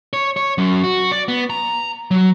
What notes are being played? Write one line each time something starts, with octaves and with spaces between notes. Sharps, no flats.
C#5
C#5
F#2
F#4
D5
B3
A#5
F#3